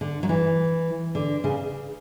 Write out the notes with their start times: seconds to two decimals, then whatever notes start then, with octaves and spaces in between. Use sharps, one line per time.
0.01 D3
0.23 F#3
0.29 E3
1.15 D3
1.44 C#3